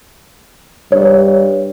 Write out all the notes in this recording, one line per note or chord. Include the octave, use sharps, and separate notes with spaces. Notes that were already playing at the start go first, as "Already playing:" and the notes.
G2 C#5